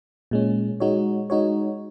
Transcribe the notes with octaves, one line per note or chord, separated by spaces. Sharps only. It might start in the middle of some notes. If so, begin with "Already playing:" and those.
A#2 G#3 C#4
G#3 D#4 F#4 C#5
G#3 D#4 F#4 C#5